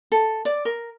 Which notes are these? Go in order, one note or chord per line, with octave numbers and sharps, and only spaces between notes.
A4
D5
A#4